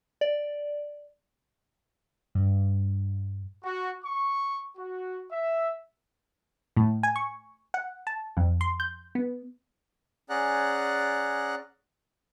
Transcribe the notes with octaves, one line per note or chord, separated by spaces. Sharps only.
D5
G2
F#4
C#6
F#4
E5
A2
G#5
C#6
F#5
A5
F2
C6
G6
B3
C#4 G#4 D5 F#5 A#5 F#6